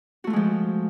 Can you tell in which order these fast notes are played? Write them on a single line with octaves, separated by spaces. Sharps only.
F#4 A3 F4 G#3 F3